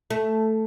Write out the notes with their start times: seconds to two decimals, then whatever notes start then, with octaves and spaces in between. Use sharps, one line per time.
0.10 A3